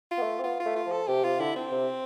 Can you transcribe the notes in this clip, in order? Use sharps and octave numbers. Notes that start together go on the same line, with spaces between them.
F4
B3
A3
C4
B3 F4
F4
A3
F4
F3
A4
C3 G4
C3 F4
D3 E4
C4
C3